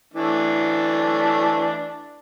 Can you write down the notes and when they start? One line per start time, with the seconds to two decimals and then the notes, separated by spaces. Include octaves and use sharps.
0.14 E3 A3 D4